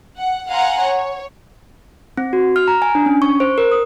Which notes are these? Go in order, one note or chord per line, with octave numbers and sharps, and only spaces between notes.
F#5
F5 F#5 G#5 A#5 C6
C#5
C4
F#4
F6
A#5
G#5
D4
C#4
C#6
C5
A#4
D#6